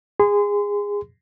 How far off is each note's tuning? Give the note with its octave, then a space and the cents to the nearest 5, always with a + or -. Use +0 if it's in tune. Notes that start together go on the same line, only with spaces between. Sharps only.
G#4 -20 C6 -30